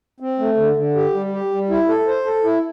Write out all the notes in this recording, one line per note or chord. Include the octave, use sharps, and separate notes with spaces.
C4
A3
D3
D3
G4
G3
G4
G3
E4
A4
C5
A4
E4